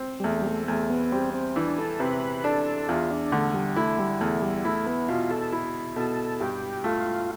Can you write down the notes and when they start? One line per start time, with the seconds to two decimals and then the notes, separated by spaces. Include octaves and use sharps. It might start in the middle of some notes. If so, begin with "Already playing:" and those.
Already playing: C4
0.20 G3
0.24 E2 A3
0.42 G3
0.47 A3
0.68 E2 A3
0.90 B3
1.12 G3 C4
1.34 C4
1.56 E3 D4
1.78 A4
2.00 C3 B4
2.44 D4 A4
2.88 E2 F4
3.10 D4
3.32 D3 A3
3.54 G3
3.76 A3 E4
3.98 G3
4.20 E2 A3
4.42 G3
4.65 A3 E4
4.86 B3
5.08 B2 F4
5.30 A4
5.52 E4
5.96 B2 A4
6.40 G2 G4
6.84 A3 F4